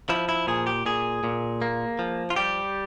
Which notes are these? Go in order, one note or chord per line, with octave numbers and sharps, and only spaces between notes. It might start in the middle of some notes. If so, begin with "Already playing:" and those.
F3 E4
E4
A#2 G#4
G4
A#2 G#4
A#2
A#3
F3
F4
G3 G4